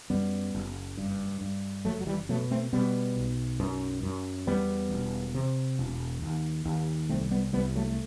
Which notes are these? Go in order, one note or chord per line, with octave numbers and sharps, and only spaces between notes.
F#2 G3 B3
F#1
G2
G2
F#1 F#3 A3
F#3
E3 G3
B2 F#3 A3
A3 C4
B2 G3 B3
B1
F#2
F#2
E2 G3 B3
E1
C3
E1
D#2
D#2
C2 A3 C4
G3 B3
C2 G3 B3
F#3 A3
A3